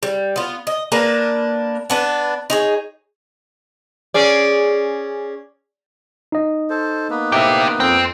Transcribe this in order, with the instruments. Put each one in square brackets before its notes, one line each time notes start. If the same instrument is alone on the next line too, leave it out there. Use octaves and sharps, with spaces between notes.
[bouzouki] G3
B3 F4
D#5
A#3 D4 A#4 B4
B3 D4 B4
D#4 G#4 C#5
[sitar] C#4 G#4 D5
[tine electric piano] D#4 D#5
[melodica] A4 C5
A#3 B3 B4
[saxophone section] A2 C5 E5 [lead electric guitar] C4 G4
[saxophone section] F2 [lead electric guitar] C4